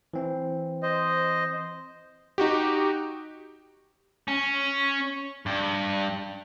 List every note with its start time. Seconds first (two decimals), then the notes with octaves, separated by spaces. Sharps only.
0.14 E3 C4
0.83 C5 D#5
2.38 D#4 F#4 G4
4.28 C#4
5.46 G2